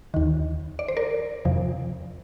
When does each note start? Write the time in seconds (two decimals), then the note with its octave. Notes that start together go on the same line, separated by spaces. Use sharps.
0.14 D#2 D#3
0.79 D5
0.88 C5
0.97 A#4 D5
1.45 F2 C3 F3